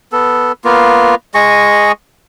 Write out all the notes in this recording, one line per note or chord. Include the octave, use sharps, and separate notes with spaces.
B3 A4
A#3 B3 F4
G#3 G#4 D#5 C#6